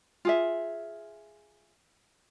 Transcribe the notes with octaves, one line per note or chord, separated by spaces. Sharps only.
F4 G#4 E5